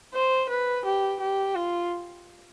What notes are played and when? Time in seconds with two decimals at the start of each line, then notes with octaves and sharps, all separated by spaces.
0.14 C5
0.50 B4
0.85 G4
1.20 G4
1.55 F4